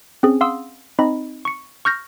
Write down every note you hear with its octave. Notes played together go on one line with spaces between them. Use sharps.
C4 C#4 G#4
F5 F#5 C6 D#6 E6
C4 D#4 D#5 B5
C#6 C#7
C#6 F6 G6 A#6